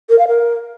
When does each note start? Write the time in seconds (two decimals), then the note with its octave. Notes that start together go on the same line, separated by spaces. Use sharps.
0.09 A#4
0.19 F5
0.28 A#4